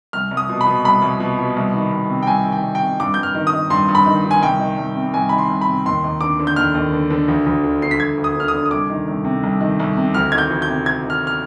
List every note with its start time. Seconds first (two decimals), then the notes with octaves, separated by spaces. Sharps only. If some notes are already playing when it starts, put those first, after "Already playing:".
0.13 C2 F6
0.31 C2
0.37 D#6
0.49 B2
0.61 B5
0.66 B2
0.84 C2 B5
1.02 C2
1.20 B2
1.39 B2
1.56 C2
1.74 D#3
1.92 C2
2.10 C3
2.23 G5
2.27 C2 G#5
2.45 D#3
2.52 G5
2.63 C2
2.75 G5
2.82 C3
3.00 G2 D6
3.14 G2 G6
3.23 F6
3.35 D#3
3.47 D#6
3.53 D#3
3.70 G2 C6
3.88 G2
3.95 B5
4.06 D#3
4.25 D#3
4.31 G#5
4.42 C2 G5
4.60 D#3
4.78 C2
4.96 C3
5.14 C2 G#5
5.29 D#3 B5
5.38 C6
5.49 C2
5.61 B5
5.67 C3
5.86 D#2 C6
6.04 D#2
6.21 D3 D6
6.39 D3
6.47 G6
6.56 D#2 F6
6.75 D#2
6.93 D3
7.10 D3
7.28 D2
7.46 D2
7.64 D3
7.82 D3 C7
7.91 B6
8.00 D2 G#6
8.18 D2
8.24 D#6
8.36 D3 F6
8.48 D#6
8.54 D3
8.66 D#6
8.71 C2 D6
8.90 D#3
9.07 C2
9.25 C3
9.43 C2
9.61 D#3
9.79 C2
9.97 C3
10.14 D2 F6
10.32 D#3 G#6
10.38 G6
10.50 D2
10.62 G6
10.68 C3
10.86 D2 G#6
11.04 D#3
11.10 F6
11.27 F6